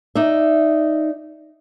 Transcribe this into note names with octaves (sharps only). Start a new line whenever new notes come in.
D#4 D5 E5